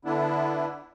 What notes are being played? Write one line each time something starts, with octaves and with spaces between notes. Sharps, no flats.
D3 B3 D4 E4